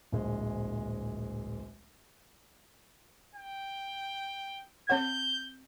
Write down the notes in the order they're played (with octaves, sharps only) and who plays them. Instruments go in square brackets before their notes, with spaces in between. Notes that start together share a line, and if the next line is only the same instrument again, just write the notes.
[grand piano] D1 A#1 G#3
[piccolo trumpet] G5
[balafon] C4 C#5 F#5 [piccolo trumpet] G6